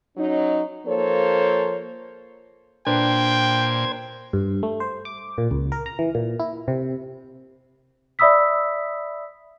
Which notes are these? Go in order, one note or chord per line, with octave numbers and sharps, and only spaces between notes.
F#3 C#4 D#4
F3 A#3 A4 C5 C#5
A#2 D4 B4 C5 G5 G#6
G2
A3
C5
D6
A#2
C#2
A#4
A#5
E3
A#2
E4
C3
D5 E5 B5 D#6 E6 B6